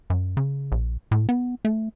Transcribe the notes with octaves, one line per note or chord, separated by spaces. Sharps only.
F#2
C#3
A#1
A2
B3
A3